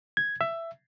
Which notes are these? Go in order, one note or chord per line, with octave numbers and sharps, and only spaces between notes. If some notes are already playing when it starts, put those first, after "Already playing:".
G#6
E5